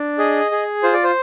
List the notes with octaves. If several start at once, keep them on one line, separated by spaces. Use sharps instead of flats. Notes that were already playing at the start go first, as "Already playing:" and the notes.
Already playing: D4
G#4 D#5
G#4
F4 C5
D5
C5